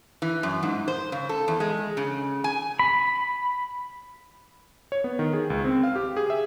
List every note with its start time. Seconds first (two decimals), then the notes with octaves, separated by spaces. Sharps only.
0.22 E3
0.43 F#2
0.63 G#2
0.88 C5
1.12 C#3
1.29 A4
1.48 E2
1.60 G#3
1.97 C#3
2.44 G#5
2.79 B5
4.92 C#5
5.04 B3
5.19 D#3
5.33 G#4
5.50 C#2
5.64 C4
5.83 F5
5.96 G4
6.17 G#4
6.30 E5